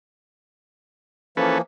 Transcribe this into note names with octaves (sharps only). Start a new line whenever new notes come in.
E3 F3 A#3 C#4 A4 B4